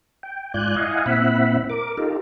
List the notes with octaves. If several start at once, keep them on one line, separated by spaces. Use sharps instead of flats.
G5
G#2 F4 D5 G#5 F#6 G6
E4 D#5 F5 F#5 G#5
A#2 C4 E4 E5 F#5 B5
A#4 D6
D#4 F4 G4 A4 A#4